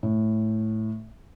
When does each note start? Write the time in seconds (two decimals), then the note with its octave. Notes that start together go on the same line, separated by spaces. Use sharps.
0.03 A2